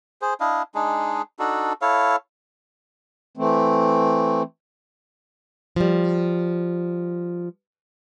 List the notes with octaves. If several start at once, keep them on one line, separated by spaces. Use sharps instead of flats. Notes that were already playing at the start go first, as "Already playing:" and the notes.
G#4 C5
D4 E4 D#5 F5
G#3 D4 D#4 G#4
D4 D#4 F#4 A4
E4 A4 C#5 F5
E3 A3 C4
F3 G3